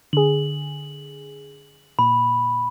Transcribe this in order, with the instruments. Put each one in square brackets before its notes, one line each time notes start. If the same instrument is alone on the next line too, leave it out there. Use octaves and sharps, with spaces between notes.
[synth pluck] D3 G#4 [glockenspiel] F#7
[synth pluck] A#2 [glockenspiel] B5